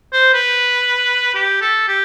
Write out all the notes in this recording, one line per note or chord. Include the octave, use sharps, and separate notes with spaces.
C5
B4
G4
A4
G4